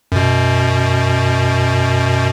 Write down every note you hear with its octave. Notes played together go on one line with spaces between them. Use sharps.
F#2 B2